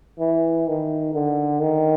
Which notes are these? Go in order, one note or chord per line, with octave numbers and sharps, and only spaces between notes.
E3
D#3
D3
D#3